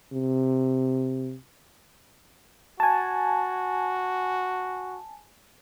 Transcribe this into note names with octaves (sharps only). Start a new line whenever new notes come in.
C3
F#4 G#5 A5